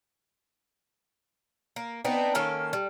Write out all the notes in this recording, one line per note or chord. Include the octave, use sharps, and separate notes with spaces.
A#3
B3 C4 D4 D#4
D#3 A#3 C#4 A4
G3